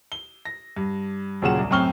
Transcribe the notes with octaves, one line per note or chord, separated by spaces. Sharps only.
G7
A#6
G2
D#2 A#2 C#3 F#3 F#5 E7
C2
F#2 A2 C4 C#6 F6 G7